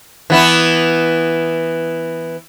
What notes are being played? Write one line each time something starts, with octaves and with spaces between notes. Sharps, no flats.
E3 B3 E4